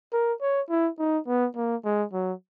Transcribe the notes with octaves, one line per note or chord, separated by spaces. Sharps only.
A#4
C#5
E4
D#4
B3
A#3
G#3
F#3